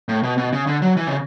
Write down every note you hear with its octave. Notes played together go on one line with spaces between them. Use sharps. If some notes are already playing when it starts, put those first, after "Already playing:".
A2
B2
B2
C#3
D3
F#3
E3
C#3